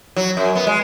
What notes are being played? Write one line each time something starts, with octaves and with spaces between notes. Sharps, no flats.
F#3
F#2
B3
G#3